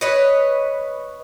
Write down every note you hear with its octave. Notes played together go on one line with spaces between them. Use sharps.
B4 C#5 D#5